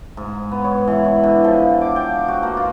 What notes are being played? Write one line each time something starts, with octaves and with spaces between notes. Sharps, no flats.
G#2
B3
C#5
E3
C#5
D3
F3
D6
G5
F#4
A#3
F4